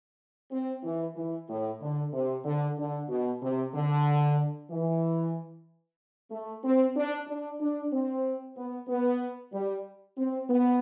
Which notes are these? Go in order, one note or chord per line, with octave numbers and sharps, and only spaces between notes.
C4
E3
E3
A2
D3
C3
D3
D3
B2
C3
D3
E3
A3
C4
D4
D4
D4
C4
B3
B3
G3
C4
B3